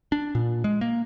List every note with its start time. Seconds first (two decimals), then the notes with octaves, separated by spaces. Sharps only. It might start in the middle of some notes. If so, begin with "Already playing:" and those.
0.12 D4
0.35 A#2
0.64 G#3
0.81 A#3